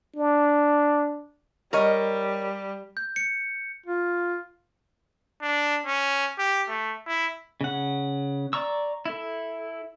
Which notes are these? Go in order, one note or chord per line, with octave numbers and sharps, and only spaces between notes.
D4
G3 A#4 C#5 D#5
G6
C#7
F4
D4
C#4
G4
A3
E4
C#3 F#5
D5 A#5 C#6 E6
E4 A4